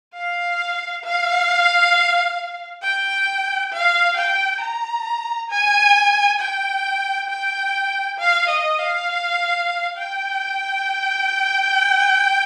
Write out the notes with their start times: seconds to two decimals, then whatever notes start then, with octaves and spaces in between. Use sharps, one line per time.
0.15 F5
1.04 F5
2.83 G5
3.73 F5
4.17 G5
4.62 A#5
5.50 G#5
6.40 G5
7.30 G5
8.19 F5
8.49 D#5
8.79 F5
9.98 G5